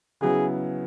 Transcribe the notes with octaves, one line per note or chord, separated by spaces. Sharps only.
C#3 F#3 B3 E4 G#4